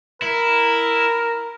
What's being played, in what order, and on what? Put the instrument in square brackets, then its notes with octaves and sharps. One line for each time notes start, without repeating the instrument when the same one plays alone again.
[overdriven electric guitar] E4 [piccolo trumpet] A#4